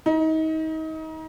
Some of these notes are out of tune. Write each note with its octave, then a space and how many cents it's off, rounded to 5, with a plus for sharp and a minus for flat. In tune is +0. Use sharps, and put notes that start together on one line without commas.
D#4 +30